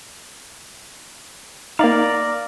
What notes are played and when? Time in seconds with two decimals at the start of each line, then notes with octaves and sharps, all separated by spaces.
1.79 A#3 D#4 A#4 D5 F5